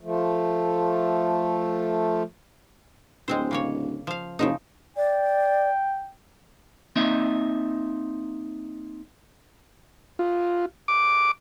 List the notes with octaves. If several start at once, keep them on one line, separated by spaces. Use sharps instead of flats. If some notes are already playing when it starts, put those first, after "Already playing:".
F3 A3
D1 G#3 C4 C5
C#3 A#3 C#5
F3 F5
F#1 C#3 F3 D#4
D5 G5
A#3 C4 D#4 D#5 E5
F4
D6